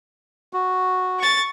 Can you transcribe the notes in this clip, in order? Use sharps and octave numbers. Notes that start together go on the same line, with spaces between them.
F#4
C#6 A6